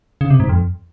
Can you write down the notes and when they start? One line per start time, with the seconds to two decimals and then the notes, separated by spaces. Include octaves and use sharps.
0.21 C#3
0.30 C3
0.40 G#2
0.49 F2